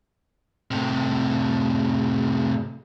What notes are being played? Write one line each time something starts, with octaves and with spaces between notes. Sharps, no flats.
A2 C3